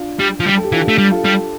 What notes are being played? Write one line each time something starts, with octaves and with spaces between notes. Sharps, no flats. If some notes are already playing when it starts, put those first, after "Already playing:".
Already playing: D4 F4
G3
F3
G3
A4
G4
E3 D4 F4
A3
G3
F4 A4
G3